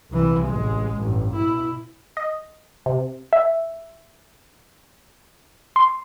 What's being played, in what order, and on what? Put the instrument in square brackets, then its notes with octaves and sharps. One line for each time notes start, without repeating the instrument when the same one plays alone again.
[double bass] C2 E3
A1 G#3
A1 G2
B2 E4
[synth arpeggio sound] D#5
C3
[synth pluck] E5
C6